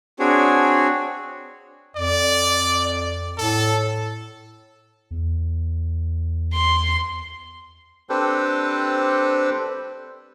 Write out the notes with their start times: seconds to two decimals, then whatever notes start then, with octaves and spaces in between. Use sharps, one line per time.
0.19 C4 D4 F#4 G#4 C#5
1.96 F2 D5
3.37 A2 A4
5.11 E2
6.53 C6
8.10 C4 D4 G4 A4 B4 C5